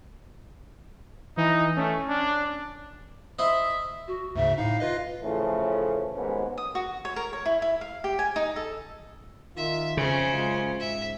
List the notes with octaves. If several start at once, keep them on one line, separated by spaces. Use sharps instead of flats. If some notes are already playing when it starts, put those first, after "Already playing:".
E3 D#4
A3 C#4
D4
E4 C5 D#5 E5
F#4
D2 G#2 C#3 E5
A2 D#4 F5
F4 B4 D#5
A2 C#3 E3 F3 A3
D#2 G#2 B2 A#3 B3 C#4
D#6
F#4
C#5
A#4
C#5
E4
E4
F5
G4
G#5
D#4
A4
D#3 F4 E5
F2 C#3 C#4 C5
F#2 G#3 F4
G#2 E5